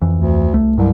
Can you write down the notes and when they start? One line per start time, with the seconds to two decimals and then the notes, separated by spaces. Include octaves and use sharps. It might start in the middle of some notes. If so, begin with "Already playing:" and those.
0.02 F2 E3
0.14 D2
0.53 C2 A3
0.78 C2 G2 F#3